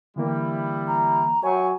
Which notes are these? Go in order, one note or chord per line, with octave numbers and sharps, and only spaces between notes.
D3 E3 G3 A#3 E4
A#5
F#3 C#5 E5 G5 G#5 C#6